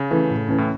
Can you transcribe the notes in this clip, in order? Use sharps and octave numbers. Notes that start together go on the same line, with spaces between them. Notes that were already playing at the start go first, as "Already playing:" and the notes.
Already playing: C#3
E3 A3 C#4
A2
E3 A3 C#4
A2